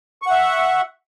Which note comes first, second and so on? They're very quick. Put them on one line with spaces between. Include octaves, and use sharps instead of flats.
C#6 F#5 E5